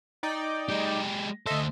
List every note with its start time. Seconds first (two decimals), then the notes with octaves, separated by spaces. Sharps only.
0.23 D#4 D5 G5
0.69 G#3 G4
1.46 D2 A4 C5 D#5 E5